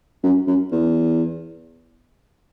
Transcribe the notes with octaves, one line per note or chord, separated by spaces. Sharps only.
F#2
F#2
E2